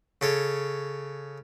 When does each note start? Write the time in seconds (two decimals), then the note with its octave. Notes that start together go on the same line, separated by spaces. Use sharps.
0.21 C#3 A4 C#5